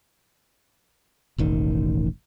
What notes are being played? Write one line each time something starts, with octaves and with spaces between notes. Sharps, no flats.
E1 A1 D#3